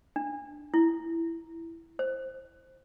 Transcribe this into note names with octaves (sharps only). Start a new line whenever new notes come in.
D4
E4
C5